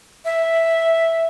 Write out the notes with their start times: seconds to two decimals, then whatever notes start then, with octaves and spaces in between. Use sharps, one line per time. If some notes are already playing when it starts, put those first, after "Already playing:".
0.25 E5